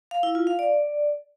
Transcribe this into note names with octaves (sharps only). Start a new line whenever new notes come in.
F5
E4
F4
F5
D5